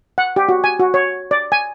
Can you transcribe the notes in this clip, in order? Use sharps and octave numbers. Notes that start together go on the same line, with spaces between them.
F#5
G4
F#4
G#5
F#4
C#5
D5
G#5